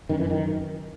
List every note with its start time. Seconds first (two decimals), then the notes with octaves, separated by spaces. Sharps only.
0.09 F#2 D#3
0.20 E3
0.30 D#3